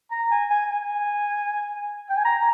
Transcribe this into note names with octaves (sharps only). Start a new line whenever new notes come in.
A#5
G#5
G#5
G#5
G5
G#5
A#5